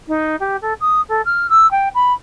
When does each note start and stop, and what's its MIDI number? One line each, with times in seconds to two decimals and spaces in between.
0.08 0.36 63
0.40 0.57 67
0.62 0.74 69
0.81 1.01 87
1.09 1.22 69
1.26 1.47 89
1.49 1.70 88
1.71 1.89 79
1.95 2.13 83